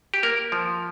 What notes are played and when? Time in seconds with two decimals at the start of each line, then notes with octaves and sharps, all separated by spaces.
0.14 G4
0.23 A#3 A#4
0.52 F3